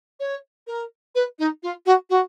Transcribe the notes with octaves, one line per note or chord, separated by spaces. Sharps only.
C#5
A#4
B4
D#4
F4
F#4
F#4